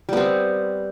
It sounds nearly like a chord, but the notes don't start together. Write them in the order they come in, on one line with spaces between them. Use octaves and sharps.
G3 B3 C4